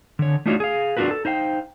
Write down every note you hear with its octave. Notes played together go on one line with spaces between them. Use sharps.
D3 C#5
A3 D4 D#4 F4 F#4 C#5
G#4 F5
D4 F4 F#4 A#4 B4
A4
D#4 C5 F5 G5